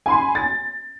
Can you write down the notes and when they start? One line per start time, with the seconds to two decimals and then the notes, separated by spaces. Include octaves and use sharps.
0.06 G#5 B5 C6
0.35 A6